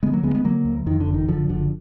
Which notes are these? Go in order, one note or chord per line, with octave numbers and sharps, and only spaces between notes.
D3 G#3 B3
F#3 A#3
D2 G#3 B3
G#3 B3
D3 F#3 A#3
D2
F2 D#3
D3
F#1
D#3
F#1 D3 F3
F#1 D3 F3